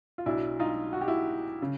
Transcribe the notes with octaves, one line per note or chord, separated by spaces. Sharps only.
F4
B1 B2 F#3 D4 E4
D#4 F4
F#4
G4
E4 F#4
C#3